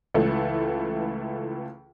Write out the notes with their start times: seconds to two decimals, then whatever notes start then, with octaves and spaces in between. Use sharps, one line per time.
0.14 C#2 E3 A3